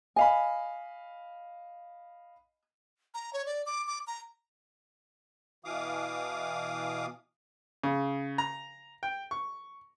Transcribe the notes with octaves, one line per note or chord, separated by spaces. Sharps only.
D#5 F5 G#5 B5
A#5
C#5
D5
D6
D6
A#5
B2 E3 F5 D6 D#6
C#3
A#5
G5
C#6